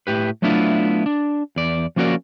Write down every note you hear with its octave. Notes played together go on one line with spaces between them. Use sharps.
A2 G4 B4
F#3 A3 B3 D4 E4 F4
D4
E2 D5
F3 A#3 C#4 F#4 A#4 D5